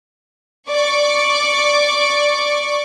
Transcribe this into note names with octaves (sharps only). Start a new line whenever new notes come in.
D5 C#6 D6